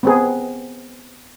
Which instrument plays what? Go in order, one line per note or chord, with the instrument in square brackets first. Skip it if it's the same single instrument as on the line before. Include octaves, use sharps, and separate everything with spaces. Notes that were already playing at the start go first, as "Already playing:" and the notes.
[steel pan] B3 C4 G#4